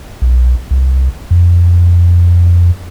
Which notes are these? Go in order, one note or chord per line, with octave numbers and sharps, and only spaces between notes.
B1
C2
F2